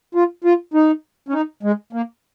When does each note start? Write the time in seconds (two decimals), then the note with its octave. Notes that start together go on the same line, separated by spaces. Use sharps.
0.15 F4
0.44 F4
0.74 D#4
1.28 C#4
1.33 D#4
1.63 G#3
1.93 A#3